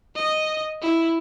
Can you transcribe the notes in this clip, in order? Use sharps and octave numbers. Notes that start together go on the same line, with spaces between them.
D#5
E4